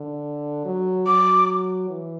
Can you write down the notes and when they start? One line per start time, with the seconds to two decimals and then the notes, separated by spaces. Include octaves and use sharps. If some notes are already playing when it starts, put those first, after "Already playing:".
Already playing: D3
0.65 F#3
1.07 F#3 D6
1.89 E3